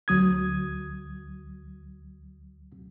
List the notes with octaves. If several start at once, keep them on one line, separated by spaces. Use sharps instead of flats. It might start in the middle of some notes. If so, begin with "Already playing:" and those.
D2 F#3 D#6 G#6